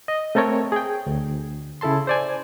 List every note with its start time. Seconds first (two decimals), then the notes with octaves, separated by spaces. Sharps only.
0.08 D#5
0.35 A3 C4 A4 A#4 C#5
0.72 G#4 G5
1.06 D2
1.81 C#3 E4 A4 A5 C6
2.07 C5 D5 G#5